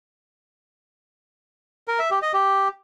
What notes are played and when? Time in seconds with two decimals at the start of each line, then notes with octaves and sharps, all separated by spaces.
1.88 A#4
1.99 E5
2.11 G4
2.22 D#5
2.34 G4